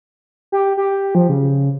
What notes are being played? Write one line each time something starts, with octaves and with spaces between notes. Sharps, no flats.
G4
G4
F3
C#3